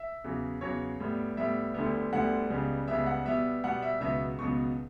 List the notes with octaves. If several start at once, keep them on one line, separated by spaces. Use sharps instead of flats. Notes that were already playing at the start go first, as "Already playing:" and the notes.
Already playing: E5
E2 C#3 F#3
E2 C#3 F#3 C#5
A2 G3 B3
A2 G3 B3 E5
D2 D3 G3 B3
D2 D3 G3 B3 F#5
C#2 C#3 G3 B3
C#2 C#3 G3 B3 E5
F#5
B2 G3 B3 E5
B2 G3 B3 F#5
E5
C#2 B2 F#3 B3 E5
C#2 B2 F#3 B3 C#6